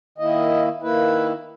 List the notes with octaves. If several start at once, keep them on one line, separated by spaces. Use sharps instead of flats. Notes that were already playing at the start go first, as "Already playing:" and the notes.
D#3 A#3 E4 D#5
D#3 A#3 E4 B4